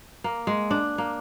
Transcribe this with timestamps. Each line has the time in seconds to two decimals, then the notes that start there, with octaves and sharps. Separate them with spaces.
0.24 A#3
0.47 G#3
0.71 D4
0.98 A#3